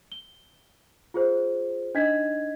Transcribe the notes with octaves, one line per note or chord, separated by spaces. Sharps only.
G7
F4 G#4 C5
D4 D#4 D#5 G#6 B6